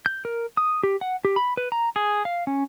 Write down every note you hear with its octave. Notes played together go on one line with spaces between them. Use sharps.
G6
A#4
D#6
G4
F#5
G4
B5
B4
A#5
G#4
F5
C#4